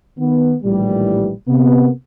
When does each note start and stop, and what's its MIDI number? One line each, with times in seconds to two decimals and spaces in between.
0.18 0.54 51
0.18 0.54 59
0.64 1.30 34
0.64 1.30 45
0.64 1.30 51
0.64 1.30 52
0.64 1.30 55
1.48 1.88 48
1.48 1.88 58
1.48 1.88 59